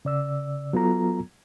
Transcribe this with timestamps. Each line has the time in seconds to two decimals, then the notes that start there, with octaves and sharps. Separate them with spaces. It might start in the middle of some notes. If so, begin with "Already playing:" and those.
0.05 C#3 D5 E6
0.73 F#3 B3 F4 A4 A#5